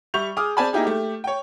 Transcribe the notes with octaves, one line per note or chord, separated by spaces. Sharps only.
G3 E5 C#6 G6 F7
G#4 D6 D#6 F6
C4 G#4 D5 G#5 A5 B5
A#3 D#4 E4 G4 G#4
A3 G4
C#5 G5